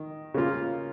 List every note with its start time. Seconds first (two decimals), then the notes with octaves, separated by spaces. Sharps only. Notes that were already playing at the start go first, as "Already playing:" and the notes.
Already playing: D#3
0.34 C#3 A#3 F4